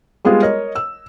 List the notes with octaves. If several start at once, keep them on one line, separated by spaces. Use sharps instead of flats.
G3 G#3 B3 F4 G#4
A#4 C#5 D#5
E6